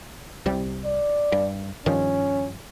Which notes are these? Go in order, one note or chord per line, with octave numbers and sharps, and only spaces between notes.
C2 C3 G3
D5
G2
G2 D#3 F3 C#4